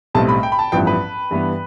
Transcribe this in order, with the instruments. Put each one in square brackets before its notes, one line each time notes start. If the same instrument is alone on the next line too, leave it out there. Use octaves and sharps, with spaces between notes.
[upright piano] B1 A2 G3 C4 [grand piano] A5
[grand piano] B5
G5
B5
A5
[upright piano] A1 G2 F3 B3 E4 [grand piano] G5
[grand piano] B4
[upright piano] G2 E3 B3